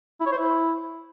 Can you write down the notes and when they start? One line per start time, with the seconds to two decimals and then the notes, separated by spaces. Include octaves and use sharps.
0.20 E4
0.26 C#5
0.32 C5
0.38 E4